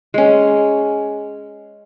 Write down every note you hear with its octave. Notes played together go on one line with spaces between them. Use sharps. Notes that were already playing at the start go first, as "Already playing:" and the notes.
G#3 C#4